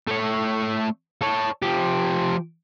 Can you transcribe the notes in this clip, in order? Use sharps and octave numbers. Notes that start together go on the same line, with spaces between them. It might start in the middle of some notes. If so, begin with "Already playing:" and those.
A3 C#5
A4 C#5
F3 G4